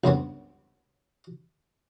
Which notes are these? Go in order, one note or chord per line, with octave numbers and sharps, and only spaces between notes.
C#2 G2 B3 C4